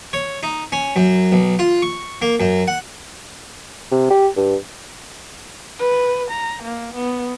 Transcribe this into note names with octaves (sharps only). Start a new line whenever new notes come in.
C#5
D#4
C#4
F#2
B1
F4
C#6
A#3
F#2
F#5
C3
G4
G2
B4
A#5
A#3
B3